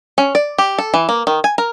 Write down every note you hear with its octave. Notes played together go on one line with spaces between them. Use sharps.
C#4
D5
G4
A4
E3
A#3
D#3
G#5
A#4